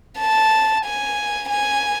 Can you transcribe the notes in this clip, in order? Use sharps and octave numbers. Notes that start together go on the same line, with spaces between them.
A5
G#5
G#5